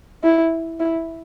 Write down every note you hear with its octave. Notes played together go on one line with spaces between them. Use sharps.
E4
E4